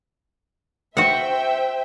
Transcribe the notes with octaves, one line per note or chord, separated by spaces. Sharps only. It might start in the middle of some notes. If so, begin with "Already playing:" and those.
F#4 C5 E5 F#5 G5